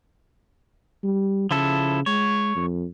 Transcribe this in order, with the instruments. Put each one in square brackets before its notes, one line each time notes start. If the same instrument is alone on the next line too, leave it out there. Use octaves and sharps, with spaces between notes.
[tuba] G3
[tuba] C#3 [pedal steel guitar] F3 E4 A4
[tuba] G#3 [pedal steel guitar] C#5
[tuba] F2